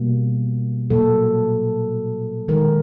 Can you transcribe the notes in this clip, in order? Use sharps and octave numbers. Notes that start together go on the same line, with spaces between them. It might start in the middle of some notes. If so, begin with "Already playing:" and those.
Already playing: B2 G3 A#3
A#2 F#3 A#3 A4
D#3 G#3 A#4